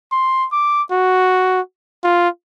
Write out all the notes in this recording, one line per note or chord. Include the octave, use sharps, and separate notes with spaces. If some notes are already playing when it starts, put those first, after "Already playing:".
C6
D6
F#4
F4